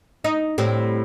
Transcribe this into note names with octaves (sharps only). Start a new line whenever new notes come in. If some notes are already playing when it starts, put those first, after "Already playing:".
D#4
A2 G3 C4